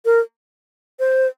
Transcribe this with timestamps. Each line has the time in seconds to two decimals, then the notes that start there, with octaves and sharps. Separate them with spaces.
0.05 A#4
0.99 C5